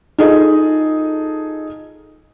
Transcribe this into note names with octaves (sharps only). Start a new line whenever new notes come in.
D#4 F4 G#4 A4 D#5